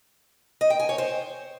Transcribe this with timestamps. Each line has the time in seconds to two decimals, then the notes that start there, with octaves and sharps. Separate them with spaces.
0.61 D#5
0.70 G5
0.80 G#5
0.89 C#5
0.98 C5